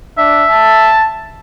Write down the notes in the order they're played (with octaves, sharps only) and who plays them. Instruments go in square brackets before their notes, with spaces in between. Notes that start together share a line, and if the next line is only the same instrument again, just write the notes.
[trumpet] D4 [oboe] E5
[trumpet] A5